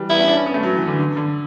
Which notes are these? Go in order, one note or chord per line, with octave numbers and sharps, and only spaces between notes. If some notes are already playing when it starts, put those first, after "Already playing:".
Already playing: E3 G3
B3 E4
C#4
D4
C#4
B3
A3
F#3
E3
D3
D3
D3